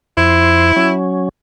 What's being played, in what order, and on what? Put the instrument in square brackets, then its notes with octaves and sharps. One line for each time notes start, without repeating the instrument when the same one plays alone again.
[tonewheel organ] F2 C5 [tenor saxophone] E4
[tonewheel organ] F#3 C#4